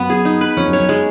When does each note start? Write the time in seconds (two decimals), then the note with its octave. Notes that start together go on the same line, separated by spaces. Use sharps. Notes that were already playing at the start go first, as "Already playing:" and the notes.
Already playing: F#2 B3 B4
0.10 G#4
0.25 D#4
0.41 B4
0.57 F2 C#4
0.68 F#2
0.73 C#5
0.80 F#2
0.89 G#3